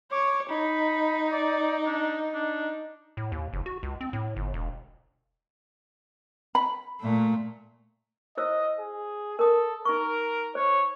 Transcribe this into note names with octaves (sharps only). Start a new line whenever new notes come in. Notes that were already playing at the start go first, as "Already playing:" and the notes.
C#5 D6
D#4 B5
D5
D4
D4
A2
D#2
F#1
F#4
C#2
C4
A2
G1
E1
B5
A#2 A3
E4 C5 D#5 E6
G#4
A4 A#4 D#6
D#4 A#4 C#6
C5 C#5